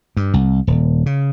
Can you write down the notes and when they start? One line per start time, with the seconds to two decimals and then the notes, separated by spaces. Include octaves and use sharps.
0.17 G2
0.34 C2
0.67 D#1
1.06 C#3